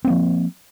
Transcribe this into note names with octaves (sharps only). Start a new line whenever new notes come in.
F3 A#3 C4